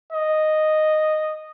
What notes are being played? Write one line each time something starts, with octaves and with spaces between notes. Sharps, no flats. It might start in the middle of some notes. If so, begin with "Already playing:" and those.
D#5